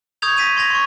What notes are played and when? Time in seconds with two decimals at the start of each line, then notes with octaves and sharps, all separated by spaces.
0.22 C#6 D#6 G6 G#6 F7
0.37 A#6 B6 D#7 F7
0.57 C6 G#6 A#6 F7
0.70 C6 C#6